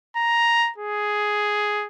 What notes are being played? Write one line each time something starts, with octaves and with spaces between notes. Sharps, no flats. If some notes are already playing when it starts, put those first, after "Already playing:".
A#5
G#4